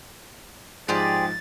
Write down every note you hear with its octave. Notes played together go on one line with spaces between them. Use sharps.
G#2 F3 F4 G4 G#4 D5 A6